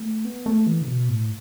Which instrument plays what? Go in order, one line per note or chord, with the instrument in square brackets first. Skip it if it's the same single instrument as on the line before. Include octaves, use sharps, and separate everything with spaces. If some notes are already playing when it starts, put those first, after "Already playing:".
Already playing: [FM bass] A3
B3
A3
E3
C#3
B2
A2